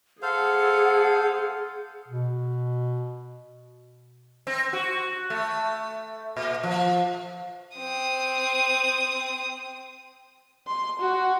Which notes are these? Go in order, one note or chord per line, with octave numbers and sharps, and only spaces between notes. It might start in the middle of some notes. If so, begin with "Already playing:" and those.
G#4 A4 C5 F5 F#5
B2
C4
F#4
A3
A#2
F3
C4 D#6
C6
F#4